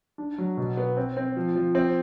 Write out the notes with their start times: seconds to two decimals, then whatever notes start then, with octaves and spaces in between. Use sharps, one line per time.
0.18 D4
0.38 F#3
0.57 B2
0.77 B3
0.97 C4
1.17 C4
1.37 F3
1.56 F3
1.75 C4